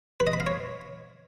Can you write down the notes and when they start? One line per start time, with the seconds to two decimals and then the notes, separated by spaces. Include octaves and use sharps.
0.20 B4
0.27 D#5
0.33 B5
0.40 F5
0.47 C#5